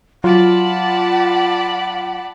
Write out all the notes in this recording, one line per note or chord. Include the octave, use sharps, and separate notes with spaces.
F#3 F4 D5 F#5 A5 B5